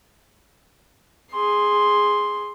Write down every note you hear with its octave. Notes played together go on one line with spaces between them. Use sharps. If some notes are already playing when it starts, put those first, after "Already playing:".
G#4 C6